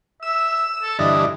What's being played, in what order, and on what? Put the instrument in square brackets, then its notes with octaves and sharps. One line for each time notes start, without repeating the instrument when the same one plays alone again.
[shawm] E5 [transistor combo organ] E6
[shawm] A4
[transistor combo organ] G2 D3 E3 [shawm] D#5